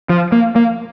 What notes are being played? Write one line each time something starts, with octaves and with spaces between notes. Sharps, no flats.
F3
A#3
A#3